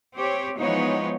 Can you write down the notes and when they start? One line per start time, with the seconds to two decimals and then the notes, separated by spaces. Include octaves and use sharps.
0.15 C4 G4 C#5
0.59 E3 F3 G#3 B3 D#4 C#5